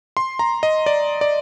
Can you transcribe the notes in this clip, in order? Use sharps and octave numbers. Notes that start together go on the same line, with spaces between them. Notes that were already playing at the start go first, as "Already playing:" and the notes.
C6
A#5
D#5
D5
D5